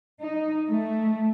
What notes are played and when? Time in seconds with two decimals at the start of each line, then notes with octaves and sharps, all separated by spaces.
0.22 D#4
0.68 A3